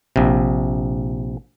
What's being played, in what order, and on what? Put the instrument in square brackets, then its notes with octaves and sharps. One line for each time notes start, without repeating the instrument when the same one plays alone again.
[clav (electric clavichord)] A#1 C3